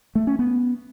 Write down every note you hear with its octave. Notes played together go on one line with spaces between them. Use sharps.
A3
C#4
B3